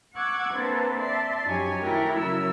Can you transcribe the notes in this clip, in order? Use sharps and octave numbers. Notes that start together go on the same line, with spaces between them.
F#5 C#6 D6 E6 F#6 G#6
A#3 C4 D4 A4 B4
D5 E5 A5 C6
F#2 F3 D#4 G4 C#5 G#5
D#3 A3 E4 F#4 G4 A#4
C#3 F#3 A#4 E6